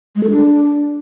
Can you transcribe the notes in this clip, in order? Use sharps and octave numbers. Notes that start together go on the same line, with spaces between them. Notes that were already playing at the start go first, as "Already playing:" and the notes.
G#3
A4
D4